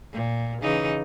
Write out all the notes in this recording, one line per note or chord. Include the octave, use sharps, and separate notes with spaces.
A#2
C#3 E3 D#4